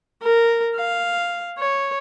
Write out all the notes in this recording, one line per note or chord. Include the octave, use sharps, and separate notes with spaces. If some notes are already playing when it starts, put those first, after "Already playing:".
A#4
F5
C#5